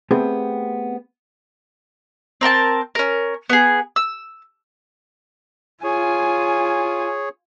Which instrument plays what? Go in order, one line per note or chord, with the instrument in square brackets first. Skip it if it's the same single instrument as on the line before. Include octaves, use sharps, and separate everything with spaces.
[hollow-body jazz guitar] A3 B3 C4 G4 G#4
[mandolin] C4 A#4 G5 A5
C#4 A#4
B3 G#4
E6
[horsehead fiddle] F4 G#5 [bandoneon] G#4 C#5